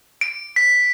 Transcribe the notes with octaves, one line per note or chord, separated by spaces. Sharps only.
D7
B6